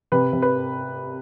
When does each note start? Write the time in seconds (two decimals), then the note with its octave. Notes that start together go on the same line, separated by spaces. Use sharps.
0.12 C3 B4
0.33 C3
0.42 B4